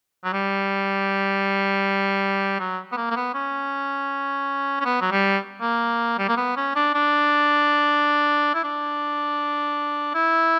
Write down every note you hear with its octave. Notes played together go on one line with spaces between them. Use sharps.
F#3
G3
F#3
B3
A#3
A#3
B3
C#4
C#4
B3
F#3
G3
A#3
G3
A#3
B3
C#4
D4
D4
E4
D4
E4